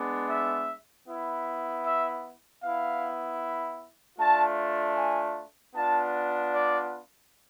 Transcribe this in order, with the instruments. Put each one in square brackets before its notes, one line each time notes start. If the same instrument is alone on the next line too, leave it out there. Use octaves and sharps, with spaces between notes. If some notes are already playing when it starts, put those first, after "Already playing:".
Already playing: [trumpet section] G#3 B3 D4
E5
B3 E4
E5
B3 E4 F5
A3 D4 F4 A5
G#5
B3 D4 F4 A5
D5